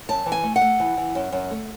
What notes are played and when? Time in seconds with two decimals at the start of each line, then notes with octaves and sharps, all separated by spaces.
0.09 F#2 A5
0.26 E3
0.32 G#5
0.43 A3
0.56 F#5
0.61 A3
0.80 E3
0.97 E3
1.15 F#2
1.32 F#2
1.51 A3